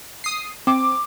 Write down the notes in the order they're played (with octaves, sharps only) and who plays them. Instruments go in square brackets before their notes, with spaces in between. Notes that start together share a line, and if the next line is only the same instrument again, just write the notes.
[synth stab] D#6 C7
[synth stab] C4 [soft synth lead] D6